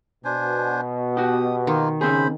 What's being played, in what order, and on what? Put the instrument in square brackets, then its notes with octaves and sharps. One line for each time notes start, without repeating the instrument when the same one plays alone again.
[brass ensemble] B2 [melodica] D4 C5 G#5
[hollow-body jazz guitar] F#4 G4 [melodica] D#6
[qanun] D#3 [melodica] A#3 D#4 F4
[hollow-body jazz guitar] C#3 C4 G#4 [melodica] C5 B5